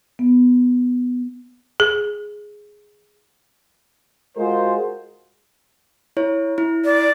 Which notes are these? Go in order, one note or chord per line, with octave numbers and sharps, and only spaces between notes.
B3
G#4
G#3 F4 F#4 G#4 A#4 C5
E4 C#5
E4
D5